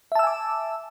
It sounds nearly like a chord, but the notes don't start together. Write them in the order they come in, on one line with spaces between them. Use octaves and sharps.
E5 A5 E6 G#5 D6